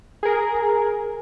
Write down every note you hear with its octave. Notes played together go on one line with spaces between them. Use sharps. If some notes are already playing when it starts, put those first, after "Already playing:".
G#4 A#4